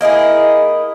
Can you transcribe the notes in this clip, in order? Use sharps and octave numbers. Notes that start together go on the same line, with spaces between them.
A#3 D#4 E4 G#4